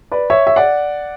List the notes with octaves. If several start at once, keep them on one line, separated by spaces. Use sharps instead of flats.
B4 D5
C#5 E5
E5
D5 F#5